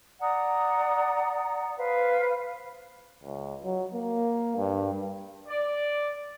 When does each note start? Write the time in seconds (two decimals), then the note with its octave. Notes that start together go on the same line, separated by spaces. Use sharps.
0.21 D5 F#5 A#5 D#6
1.78 B4 C5 F5
3.23 C#2
3.64 F#3
3.93 A#3
4.56 G2
5.49 D5